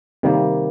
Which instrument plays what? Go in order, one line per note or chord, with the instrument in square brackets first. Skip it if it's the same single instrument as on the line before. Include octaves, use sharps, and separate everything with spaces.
[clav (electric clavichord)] C3 D#3 G3 A#3